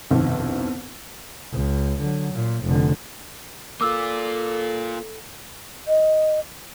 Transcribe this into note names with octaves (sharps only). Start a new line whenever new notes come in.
G1 C2 F2 B2 D#3
C#2
D3 F#3
A#2
F1 D3
A#3 F4 A4 D6 E6
D#5